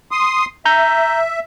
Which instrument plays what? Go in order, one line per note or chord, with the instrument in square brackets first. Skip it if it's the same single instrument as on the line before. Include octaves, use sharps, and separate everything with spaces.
[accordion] C6 D#6
[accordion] E5 [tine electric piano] A#5 G6